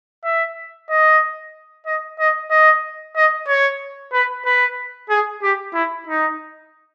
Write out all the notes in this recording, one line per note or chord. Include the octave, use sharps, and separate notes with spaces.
E5
D#5
D#5
D#5
D#5
D#5
C#5
B4
B4
G#4
G4
E4
D#4